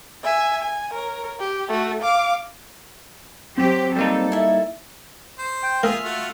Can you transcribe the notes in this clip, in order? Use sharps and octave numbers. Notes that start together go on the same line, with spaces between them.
E5 G#5
G#5
A#4 C#5
G4
A3 F#4
F5 D6
F#3 C4 G4
G3 A#3 D#4 A4
E4 E5
C5
G5
A#3 F4 G#4 E5 F6
A3 F4 F#4